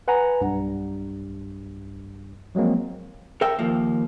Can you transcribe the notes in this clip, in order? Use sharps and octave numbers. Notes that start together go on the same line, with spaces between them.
B4 F#5 G#5 A#5
B1 G2
F3 F#3 G#3 A#3 C4
A4 A#4 E5 G5
D#2 F3 A#3